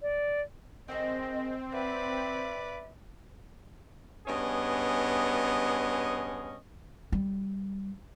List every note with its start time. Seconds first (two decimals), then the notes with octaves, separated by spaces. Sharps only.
0.02 D5
0.88 D3 D#3 G#3 C4 D#5
1.72 F#4 B4 D5 E5
4.27 G2 B3 C#4 G#4 D#5
7.12 G3